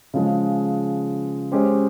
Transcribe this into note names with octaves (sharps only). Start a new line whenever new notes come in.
C#3 F3 G#3
G#3 C#4 G4 C5